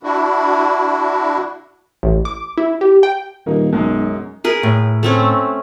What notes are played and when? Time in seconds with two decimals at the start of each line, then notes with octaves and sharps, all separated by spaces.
0.03 D4 E4 F#4
2.03 A1
2.25 D6
2.58 E4
2.81 G4
3.03 G5
3.46 D#1 A#3 D#4
3.73 B1 F#2 G#3
4.44 G#4 A#4 B4
4.63 A2
5.03 A3 C4 C#4